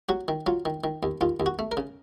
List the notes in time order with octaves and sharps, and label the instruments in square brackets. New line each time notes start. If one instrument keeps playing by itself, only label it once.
[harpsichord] F#3 F#4
D#3
F#3 F4
D#3
D#3
D#2
D#2 F4
D#2
F#4
A3
A#4
C#3